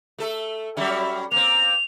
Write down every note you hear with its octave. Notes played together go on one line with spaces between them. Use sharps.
A3 A4
F#3 G3 C#4 E5
A#3 C4 F7